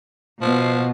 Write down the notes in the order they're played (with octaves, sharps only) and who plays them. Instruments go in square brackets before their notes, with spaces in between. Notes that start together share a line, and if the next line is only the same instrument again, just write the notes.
[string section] B2 [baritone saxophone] F3